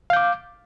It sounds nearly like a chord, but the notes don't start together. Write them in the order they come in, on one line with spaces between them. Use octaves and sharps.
F5 G6 D6